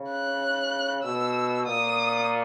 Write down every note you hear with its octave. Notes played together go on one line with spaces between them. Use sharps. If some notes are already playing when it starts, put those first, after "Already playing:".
Already playing: C#3
F#6
B2 E6
A#2 D#6